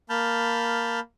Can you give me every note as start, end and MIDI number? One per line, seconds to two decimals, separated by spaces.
0.10 1.00 58
0.10 1.00 81
0.10 1.00 83
0.10 1.00 89
0.10 1.00 91